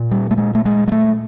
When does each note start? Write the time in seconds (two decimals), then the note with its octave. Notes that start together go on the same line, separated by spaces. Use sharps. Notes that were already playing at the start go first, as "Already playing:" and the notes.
Already playing: A#2
0.11 G3
0.31 A3
0.38 G#3
0.55 A3
0.65 G#3
0.88 G#3
0.92 A3